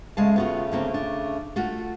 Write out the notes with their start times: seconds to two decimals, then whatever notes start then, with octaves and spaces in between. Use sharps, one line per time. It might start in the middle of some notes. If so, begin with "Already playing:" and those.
0.17 C#3 G#3 A3 F5 A5
0.36 B3 F4 F#4
0.72 D3 A#3 C4
0.94 D4
1.56 A3 F4 F#4